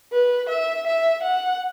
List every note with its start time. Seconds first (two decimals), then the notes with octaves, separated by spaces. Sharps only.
0.12 B4
0.49 E5
0.86 E5
1.22 F#5